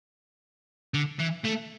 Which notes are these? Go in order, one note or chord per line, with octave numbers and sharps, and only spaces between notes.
D3
E3
A3